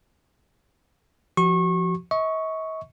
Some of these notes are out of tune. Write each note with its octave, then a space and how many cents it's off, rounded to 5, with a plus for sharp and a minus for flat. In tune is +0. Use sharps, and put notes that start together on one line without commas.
F3 +0 F#4 +35 C#6 -30
D#5 +45 C#6 +0